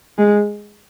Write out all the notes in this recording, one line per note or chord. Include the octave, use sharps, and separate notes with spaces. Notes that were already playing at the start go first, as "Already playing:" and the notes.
G#3